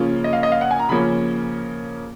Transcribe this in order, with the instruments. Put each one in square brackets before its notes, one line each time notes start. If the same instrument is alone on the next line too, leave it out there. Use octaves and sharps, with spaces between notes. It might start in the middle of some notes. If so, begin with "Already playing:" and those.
Already playing: [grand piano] C#3 F3 A#3 C#4 F4
D#5
F5
D#5
F5
F#5
G#5
A#5
C#3 F3 A#3 C#4 B5